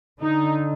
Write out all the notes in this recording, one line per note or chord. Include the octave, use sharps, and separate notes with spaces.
D3 D#4